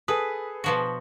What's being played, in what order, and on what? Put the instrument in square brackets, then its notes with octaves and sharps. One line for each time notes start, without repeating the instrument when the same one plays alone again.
[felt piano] G#4 A4 D#6 [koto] B4
[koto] B2 F3 F#4